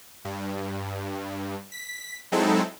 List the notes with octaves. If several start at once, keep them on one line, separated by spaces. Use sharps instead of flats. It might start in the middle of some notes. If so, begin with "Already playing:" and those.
G2
B6
F#3 G#3 C4 D#4 E4 A4